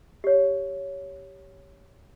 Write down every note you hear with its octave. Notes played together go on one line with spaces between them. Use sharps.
G4 C#5